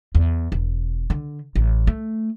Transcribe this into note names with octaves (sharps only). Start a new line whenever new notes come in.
E2
E1
D3
A1
A3